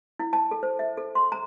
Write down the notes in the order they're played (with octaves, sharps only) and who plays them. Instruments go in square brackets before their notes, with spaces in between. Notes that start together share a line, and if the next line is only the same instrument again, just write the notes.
[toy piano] E4
A5
A4
C5
E5
A4
C6
A#5